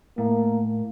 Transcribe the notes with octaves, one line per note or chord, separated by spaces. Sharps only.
A2 A#3